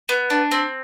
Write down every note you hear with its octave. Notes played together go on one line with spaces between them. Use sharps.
B3
D4
C4